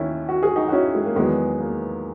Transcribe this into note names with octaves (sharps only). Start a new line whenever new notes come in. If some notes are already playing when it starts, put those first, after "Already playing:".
Already playing: D#2 D#3 A#3 C#4 E4
F#4
G#4
D#4 F#4
F#4
C#4 E4
G#3
A#3
E2 D#3 F#3 G#3 B3
A#3